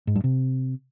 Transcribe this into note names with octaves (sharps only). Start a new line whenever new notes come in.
G#2
G2
C3